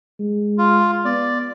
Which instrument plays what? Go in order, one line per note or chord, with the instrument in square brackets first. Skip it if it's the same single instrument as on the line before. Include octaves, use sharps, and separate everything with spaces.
[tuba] G#3
[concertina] F4
[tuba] B3 [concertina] D5